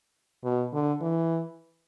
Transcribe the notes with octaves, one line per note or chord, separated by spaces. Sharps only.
B2
D3
E3